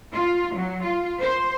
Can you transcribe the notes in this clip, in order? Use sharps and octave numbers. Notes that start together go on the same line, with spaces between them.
F4
F#3
F4
C5